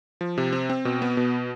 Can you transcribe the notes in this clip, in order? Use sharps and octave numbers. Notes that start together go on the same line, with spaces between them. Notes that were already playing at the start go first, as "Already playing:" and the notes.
F3
C3
C4
C4
B2
B3
B2